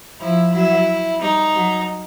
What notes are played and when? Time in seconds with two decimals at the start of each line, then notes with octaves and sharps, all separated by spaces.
0.20 F3 E4
0.54 F#3 E4
1.21 G3 D#4
1.54 F#3